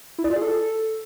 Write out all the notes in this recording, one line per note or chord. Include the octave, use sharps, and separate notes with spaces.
E4
D5
F4
G#4
A4